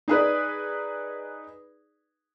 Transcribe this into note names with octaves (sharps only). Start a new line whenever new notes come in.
D#4 G#4 B4 D5